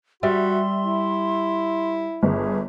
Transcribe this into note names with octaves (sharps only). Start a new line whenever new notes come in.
G3 F#4 E5 C6
E4
G1 G#4